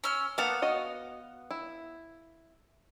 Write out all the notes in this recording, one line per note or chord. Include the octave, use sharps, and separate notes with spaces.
C#4 E6 F6
A#3 B3 F5 F#5 A5
F#4 C#5 D#5
E4